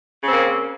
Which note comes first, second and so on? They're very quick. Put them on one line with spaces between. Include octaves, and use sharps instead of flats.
C#3 C4 A#3